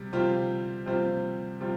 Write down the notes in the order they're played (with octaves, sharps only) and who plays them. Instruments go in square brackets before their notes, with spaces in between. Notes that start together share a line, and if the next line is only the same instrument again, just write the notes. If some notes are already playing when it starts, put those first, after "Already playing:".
Already playing: [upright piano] C3 G3
C3 G3 C4 F4 C5
C3 G3 C4 F4 C5
C3 G3 C4 F4